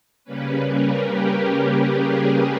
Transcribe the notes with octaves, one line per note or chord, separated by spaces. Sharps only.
C#3 G3 A#3 C#4 B4
A#4
G4
G#4